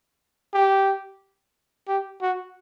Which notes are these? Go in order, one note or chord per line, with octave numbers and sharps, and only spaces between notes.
G4
G4
F#4